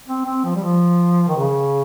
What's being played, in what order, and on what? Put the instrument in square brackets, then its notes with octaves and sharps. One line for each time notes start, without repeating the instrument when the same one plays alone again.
[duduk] C4
C4
F3
G3
F3
D#3
C#3